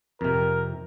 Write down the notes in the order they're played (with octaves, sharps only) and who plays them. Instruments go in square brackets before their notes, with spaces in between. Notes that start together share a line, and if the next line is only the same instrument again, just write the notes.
[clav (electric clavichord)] F2 C3 [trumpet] A#4